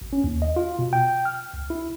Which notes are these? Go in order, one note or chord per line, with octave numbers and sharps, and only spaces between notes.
G#1
C#4
D#2
D#5
F4
B2
G5
F6
C#2
E4